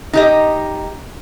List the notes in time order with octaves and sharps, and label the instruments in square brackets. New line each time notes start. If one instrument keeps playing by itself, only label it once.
[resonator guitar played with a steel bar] D#4 G4 D#5